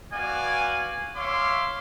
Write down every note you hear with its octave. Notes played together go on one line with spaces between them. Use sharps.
B3 F#4 D5 F5 G#5
C#5 E5 F5 C6 D6